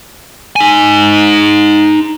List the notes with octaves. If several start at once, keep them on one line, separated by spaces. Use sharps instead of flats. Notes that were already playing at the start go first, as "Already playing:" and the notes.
D#4 G#5